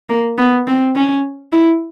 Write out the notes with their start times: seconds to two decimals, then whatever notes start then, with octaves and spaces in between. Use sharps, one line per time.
0.10 A#3
0.38 B3
0.67 C4
0.96 C#4
1.53 E4